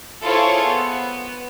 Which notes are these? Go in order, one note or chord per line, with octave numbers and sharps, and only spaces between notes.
E4 F4 G#4 A4 C5 C#5
B3